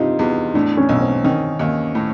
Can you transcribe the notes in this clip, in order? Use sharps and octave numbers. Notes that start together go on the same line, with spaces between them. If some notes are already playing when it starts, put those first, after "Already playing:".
Already playing: G2 C3 D#4 F4
E2
A2 D4
C#4
B1
C4
D#3 C#4
D#2
A2